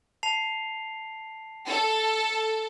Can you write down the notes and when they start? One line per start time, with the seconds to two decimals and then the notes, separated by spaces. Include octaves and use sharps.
0.23 A5 C7 F7
1.68 A4